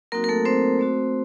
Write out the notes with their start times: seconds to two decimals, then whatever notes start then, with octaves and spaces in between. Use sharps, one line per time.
0.12 F#3 A#3 C4 D#4 F#4 A#4
0.24 A#4
0.29 A3 A4
0.45 C4 C5
0.79 A3 C4 F#4